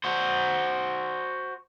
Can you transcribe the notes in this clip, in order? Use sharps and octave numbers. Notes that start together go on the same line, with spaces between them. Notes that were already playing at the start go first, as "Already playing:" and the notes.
F#4 C5